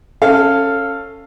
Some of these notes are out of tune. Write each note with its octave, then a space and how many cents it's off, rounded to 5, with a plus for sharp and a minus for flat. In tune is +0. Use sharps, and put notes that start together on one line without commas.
C#4 -10 A4 +15 F5 +0